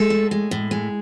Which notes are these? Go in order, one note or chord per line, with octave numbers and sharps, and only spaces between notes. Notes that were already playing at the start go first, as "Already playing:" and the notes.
Already playing: G#3 A4
A2
G#3
A2
G#3